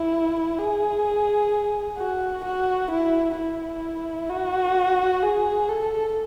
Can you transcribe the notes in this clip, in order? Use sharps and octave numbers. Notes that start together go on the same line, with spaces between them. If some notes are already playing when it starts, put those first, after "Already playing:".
Already playing: E4
G#4
F#4
F#4
E4
E4
F#4
G#4
A4